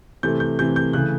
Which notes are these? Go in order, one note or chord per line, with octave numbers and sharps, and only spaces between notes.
C3 E3 A3 C4 G6
G6
C3 E3 A3 C4 G6
G6
C#3 E3 A3 F#6